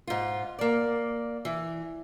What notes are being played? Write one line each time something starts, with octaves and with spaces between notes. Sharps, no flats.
G#2 F4
A#3 D5
E3